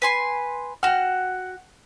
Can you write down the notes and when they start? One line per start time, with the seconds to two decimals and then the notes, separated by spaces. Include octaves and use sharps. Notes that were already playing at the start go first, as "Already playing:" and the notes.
0.02 B4 G#5 C6
0.83 F#4 F#5 G5 F6